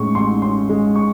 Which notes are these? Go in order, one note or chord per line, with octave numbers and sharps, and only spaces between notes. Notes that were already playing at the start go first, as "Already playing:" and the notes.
Already playing: A2 G#3 C#4 C#6
A1 C6
C#4 C6
G#3
C#6